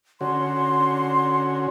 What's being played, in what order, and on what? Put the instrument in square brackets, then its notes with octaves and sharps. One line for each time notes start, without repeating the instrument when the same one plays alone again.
[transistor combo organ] D3 C#4 F#4 [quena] C6